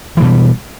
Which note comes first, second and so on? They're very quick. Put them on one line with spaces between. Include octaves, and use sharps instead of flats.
E3 G#3 B2 G3